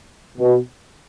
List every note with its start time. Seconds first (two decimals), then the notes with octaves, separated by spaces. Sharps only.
0.38 B2